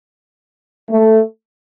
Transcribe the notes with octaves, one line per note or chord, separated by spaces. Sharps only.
A3